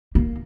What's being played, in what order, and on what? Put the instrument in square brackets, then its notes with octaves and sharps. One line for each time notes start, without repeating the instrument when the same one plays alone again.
[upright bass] A#3